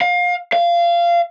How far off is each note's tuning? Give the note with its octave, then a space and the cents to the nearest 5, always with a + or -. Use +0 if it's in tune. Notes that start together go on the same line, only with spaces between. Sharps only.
F5 +25
F5 -20